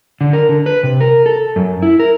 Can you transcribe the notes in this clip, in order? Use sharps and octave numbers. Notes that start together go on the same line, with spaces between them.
D3
A#4
D3
B4
C3
A#4
A4
F#2
E4
A#4